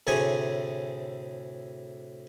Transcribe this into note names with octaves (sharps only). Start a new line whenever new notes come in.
D2 A2 C3 G#4 C#5 G#5